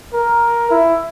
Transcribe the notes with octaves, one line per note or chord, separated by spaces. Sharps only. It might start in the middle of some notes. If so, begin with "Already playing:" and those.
A#4
E4